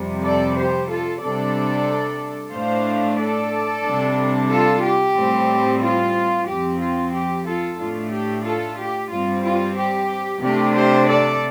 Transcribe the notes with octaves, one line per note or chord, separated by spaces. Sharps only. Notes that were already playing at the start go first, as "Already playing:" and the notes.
Already playing: F2 C3 G3
A4 D5
G4 C5
F4 A4
C3 G3 D4 A4 D5
A2 A3 D4 C5 F5
A4 D5
C3 G3 D4
F4 A4
G4
A2 G3 C4
F4
F2 F3 C4 G4
F4
G4
F4 A4
A2 A3 D4 F4
G4
F4 A4
G4
G2 G3 C4 F4
F4
G4
C3 A3 D4 G4
G4 C5
A4 D5